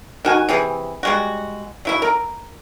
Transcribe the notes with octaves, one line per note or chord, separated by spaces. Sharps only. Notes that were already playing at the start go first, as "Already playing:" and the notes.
D#3 F#4 G#5
C3 E3 G#4
G3 G#3 F#4
F#3 E4 E5
A#4